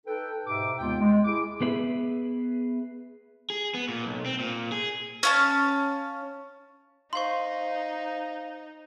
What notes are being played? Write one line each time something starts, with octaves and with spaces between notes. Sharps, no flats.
D#4 A4 B4 G5
G#2 B2 D#4 G4 E5 D6
D#2 C3 G#3 B3 F4 G5
G#3
E4 G#4 D6
B3 G#4 B4 E5
G#4
B3
A#2
B1
C4
A#2
G#4
C#4 F5 A5
D#4 C5 F5 C6 C#6